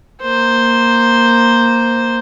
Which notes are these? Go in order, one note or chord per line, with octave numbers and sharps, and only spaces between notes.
A#3 C5